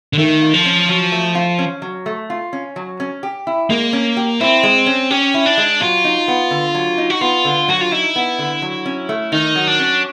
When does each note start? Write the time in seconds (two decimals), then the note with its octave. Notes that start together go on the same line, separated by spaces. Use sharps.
0.13 D3
0.18 D#3 A3
0.42 F4
0.54 F3
0.65 C#4
0.89 F#3
1.12 A3
1.35 F4
1.59 C#4
1.82 F#3
2.06 A3
2.30 F4
2.53 C#4
2.76 F#3
3.00 C#4
3.23 G4
3.47 E4
3.70 G#3 A#3
3.93 C#4
4.17 G4
4.40 C4 E4
4.63 G#3
4.86 C#4
5.11 C#4 G4
5.34 E4
5.46 D4
5.57 G#3
5.81 F#3 F4
6.04 D#4
6.28 B3
6.51 D3
6.75 F#3
6.98 D#4
7.10 F#4
7.21 B3 F4
7.45 D3
7.68 F#3 F#4
7.81 F4
7.92 D#4 E4
8.16 B3
8.39 D3
8.62 F#3
8.86 C#4
9.09 A3
9.32 D#3 D#4
9.56 F#3
9.68 D4
9.79 C#4